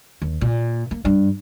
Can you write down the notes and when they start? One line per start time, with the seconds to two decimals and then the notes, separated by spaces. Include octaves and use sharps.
0.22 D#2
0.41 A#2
0.91 A#3
1.05 G2